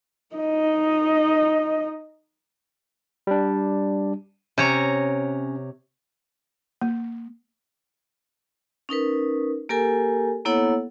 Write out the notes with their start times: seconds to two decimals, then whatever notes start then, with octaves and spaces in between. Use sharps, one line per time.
0.35 D#4 D#5
3.27 G3 D4
4.58 C3 C#4 C#5 A#5
6.82 A#3
8.89 C#4 D#4 A#4 B4
9.69 A#3 G4 A4 A#4 G#5
10.45 A#3 B3 E4 A4 C#5 F#5